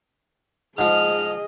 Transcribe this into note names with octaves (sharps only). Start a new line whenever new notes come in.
G#2 F3 G#4 D#5 F6